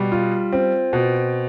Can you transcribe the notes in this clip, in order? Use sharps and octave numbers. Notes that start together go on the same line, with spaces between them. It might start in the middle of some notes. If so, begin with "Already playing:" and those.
Already playing: B2 G3
F4
C4
B2